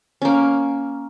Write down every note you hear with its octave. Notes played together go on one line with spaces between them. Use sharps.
A#3 C#4